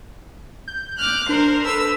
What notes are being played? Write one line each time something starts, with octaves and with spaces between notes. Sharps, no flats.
G6
D6 F6 F#6
D4 A#4 C5
A4 B4 E6